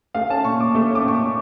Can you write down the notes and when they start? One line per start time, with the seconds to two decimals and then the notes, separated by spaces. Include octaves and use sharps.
0.15 A3 F5
0.30 C#4 A5
0.45 A#2 C#6
0.60 A#2 D6
0.75 A3
0.91 C#4 D6
1.05 A#2 C#6
1.15 D6
1.20 A#2